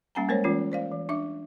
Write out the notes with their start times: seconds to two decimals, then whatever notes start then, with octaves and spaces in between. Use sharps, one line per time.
0.15 G3 A#3 C#4 F#5 G#5 A#5
0.29 G#3 A#3 A#4 C5 C#5
0.44 E3 G#3 C#4 F4
0.72 C5 D5 F5
0.92 E3
1.09 D4 E5 D6